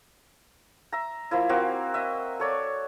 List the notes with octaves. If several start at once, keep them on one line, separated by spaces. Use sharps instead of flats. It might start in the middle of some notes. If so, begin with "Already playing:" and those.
E5 A#5
F3 A#3 E4
A#3 C4 F#4
D#5 E5
A4 C#5 D5